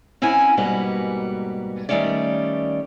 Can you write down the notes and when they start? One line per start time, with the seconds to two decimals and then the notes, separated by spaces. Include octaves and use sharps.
0.22 C4 C#4 E4 F#5 G#5
0.57 G#2 B2 G3 A#3 F#4 B4
1.89 D#3 F#3 G3 A3 C#4 D5